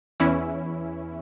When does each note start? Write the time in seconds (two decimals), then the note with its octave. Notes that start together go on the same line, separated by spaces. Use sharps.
0.20 E2 E3 C#4 E4